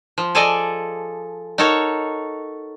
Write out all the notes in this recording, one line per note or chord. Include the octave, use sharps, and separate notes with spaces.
F3
G#4 A4 D5 D#5 G#5
D#4 F#4 A4 A#4 C#5